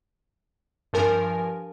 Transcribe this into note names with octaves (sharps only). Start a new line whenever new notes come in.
G2 F3 A#4 G#5